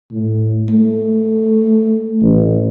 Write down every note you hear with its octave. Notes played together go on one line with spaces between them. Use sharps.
A2
A3
A1